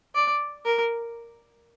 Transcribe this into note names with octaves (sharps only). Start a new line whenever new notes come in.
D5
A#4